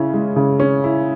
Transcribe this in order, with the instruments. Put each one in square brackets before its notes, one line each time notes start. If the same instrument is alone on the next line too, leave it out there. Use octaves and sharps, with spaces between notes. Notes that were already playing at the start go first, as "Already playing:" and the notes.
Already playing: [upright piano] C#3 C#4 E4
G#3
C#3
C#4
E4